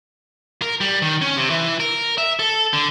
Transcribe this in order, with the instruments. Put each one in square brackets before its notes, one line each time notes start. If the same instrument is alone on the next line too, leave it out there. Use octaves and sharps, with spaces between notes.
[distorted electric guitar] A#4
G3
D#3
C#4
C3
E3
A#4
E5
A4
D3